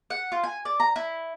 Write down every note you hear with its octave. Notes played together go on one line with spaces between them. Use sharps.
F#5
F4
G#5
D5
A#5
E4